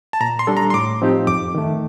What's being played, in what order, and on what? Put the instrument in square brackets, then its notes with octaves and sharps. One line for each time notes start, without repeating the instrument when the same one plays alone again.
[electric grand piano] A5
[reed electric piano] A#2 [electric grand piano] A#5
[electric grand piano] C6
[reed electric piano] G3 D4 A4
[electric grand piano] A#5
C6
[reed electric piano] A2 [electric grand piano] D6
[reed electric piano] F3 C4 D#4 G4
[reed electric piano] F2 [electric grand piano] D6
[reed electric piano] D#3 A3